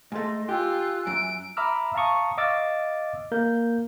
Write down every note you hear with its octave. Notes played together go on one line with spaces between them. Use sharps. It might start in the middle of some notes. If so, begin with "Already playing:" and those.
G#2 A3 D#5 C6
F4 G4 G#5 E6 F#6
F#2 D7
E5 A#5 B5 D6 E6 F6
F5 A5 A#5 C#6 D#6
D#5 F5 D6 E6 F6 A6
A#3 A#4 G6